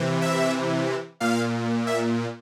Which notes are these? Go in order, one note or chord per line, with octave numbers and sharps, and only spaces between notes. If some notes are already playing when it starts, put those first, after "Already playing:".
Already playing: C3 E3
E5
A#2 F5
E5